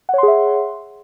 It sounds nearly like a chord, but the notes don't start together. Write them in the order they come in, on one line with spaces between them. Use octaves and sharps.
F#5 C#5 C6 G#4 E5